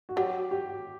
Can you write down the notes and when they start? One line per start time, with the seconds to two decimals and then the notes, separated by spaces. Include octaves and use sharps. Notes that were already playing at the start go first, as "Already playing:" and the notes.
0.09 F#4
0.16 F#3 G4
0.51 G4